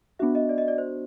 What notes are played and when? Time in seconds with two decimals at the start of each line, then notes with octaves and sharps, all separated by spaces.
0.19 B3 D4 F#4 E5
0.35 D#5
0.49 D5
0.58 D#5
0.68 D5
0.78 C5